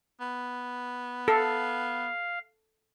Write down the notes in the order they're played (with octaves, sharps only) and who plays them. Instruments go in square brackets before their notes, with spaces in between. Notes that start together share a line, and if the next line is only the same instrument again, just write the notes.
[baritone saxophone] B3
[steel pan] A4 [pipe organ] F5